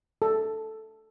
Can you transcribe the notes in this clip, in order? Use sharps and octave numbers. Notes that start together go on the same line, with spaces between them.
A4